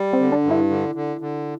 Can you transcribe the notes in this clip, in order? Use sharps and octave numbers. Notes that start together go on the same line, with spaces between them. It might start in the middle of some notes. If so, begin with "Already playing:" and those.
Already playing: G3
C4
D3
D4
G2
E4
D3
D3
D3